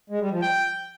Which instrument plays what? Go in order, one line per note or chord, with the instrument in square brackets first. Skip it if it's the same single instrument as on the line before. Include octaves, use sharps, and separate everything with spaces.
[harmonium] G#3
G3
F3
[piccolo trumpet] G5